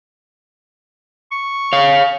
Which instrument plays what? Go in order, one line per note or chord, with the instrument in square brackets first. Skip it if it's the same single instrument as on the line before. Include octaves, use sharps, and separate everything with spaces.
[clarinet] C#6
[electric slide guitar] C#5 F5